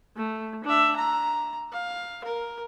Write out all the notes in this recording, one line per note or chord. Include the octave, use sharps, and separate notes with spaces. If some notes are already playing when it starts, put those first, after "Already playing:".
A3
D4 E5
A#5
F5
A#4